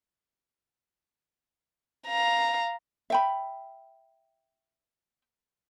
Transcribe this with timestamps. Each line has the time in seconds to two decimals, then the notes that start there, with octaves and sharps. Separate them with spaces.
2.08 F5 A#5
3.10 E5 G5 B5